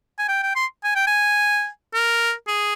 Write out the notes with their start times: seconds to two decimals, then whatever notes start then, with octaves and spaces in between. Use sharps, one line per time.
0.19 G#5
0.29 G5
0.43 G5
0.56 C6
0.84 G#5
0.95 G5
1.07 G#5
1.94 A#4
2.48 G#4